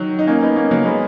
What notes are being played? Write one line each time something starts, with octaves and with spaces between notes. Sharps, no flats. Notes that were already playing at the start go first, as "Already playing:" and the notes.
Already playing: D#3 F#3
D#4
A#3 C#4
B3 D#4
A#3 C#4
F#3 A#3
G#3 B3